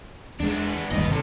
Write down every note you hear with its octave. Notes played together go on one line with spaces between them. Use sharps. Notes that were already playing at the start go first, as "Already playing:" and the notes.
E2 G#3 B3 D4
G1 D#2 G#2 B4 D#5
C3 A4